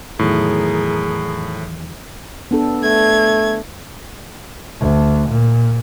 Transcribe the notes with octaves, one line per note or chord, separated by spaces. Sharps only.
E2 A2 D#3 F#3 G#4 A#4
B3 D4 A4
A3 G#6
D2
A#2